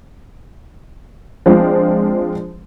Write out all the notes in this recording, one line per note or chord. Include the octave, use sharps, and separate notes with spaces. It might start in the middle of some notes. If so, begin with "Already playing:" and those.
F3 G#3 C4 D4 F4